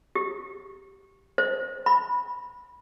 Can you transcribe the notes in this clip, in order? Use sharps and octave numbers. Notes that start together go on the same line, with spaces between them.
G4
C5
B5